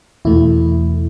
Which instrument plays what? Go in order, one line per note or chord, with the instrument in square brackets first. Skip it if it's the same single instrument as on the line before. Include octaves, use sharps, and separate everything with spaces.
[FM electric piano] E2 B2 A3 E4